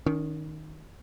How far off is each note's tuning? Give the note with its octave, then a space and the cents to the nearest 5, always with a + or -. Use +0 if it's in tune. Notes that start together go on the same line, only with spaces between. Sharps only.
D#3 +0 C#4 +40